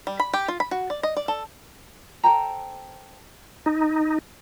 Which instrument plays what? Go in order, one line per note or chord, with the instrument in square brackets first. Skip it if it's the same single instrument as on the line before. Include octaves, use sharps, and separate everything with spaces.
[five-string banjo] G3
B5
G4
F4
B5
F#4
D5
D#5
D5
A4
[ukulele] A4 C5 G5 A#5
[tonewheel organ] D#4